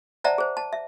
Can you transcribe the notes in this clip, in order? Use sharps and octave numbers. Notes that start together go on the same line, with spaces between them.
C5 D5 E5 F#5 A5 A#5
G#4 C5
A5
E5